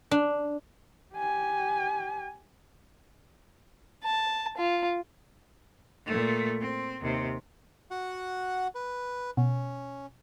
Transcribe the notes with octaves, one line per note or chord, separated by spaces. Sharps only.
D4
G4 G#5
A5
F4
A#2 A3
C4
D#2 C3
F#4 F#5
B4
B2 C#4